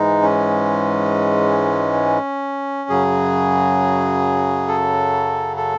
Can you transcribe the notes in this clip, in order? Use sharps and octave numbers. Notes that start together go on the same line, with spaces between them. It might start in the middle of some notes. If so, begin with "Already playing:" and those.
Already playing: G#2 E3 G#3 D#4
C#4
F#2 C#3 F#3 G#4
A4
A4